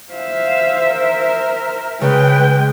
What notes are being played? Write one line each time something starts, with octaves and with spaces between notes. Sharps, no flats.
C5 E5 F5
A#4
C#3 G#3 B4 G5